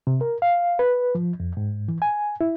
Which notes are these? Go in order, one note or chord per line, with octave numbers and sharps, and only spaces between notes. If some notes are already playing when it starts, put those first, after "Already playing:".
C3
A#4
F5
B4
F3
F2
G#2
E3
G#5
E4